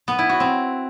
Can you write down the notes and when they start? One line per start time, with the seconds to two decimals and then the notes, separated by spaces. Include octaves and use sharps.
0.08 B3
0.19 E4
0.29 F#4
0.40 C4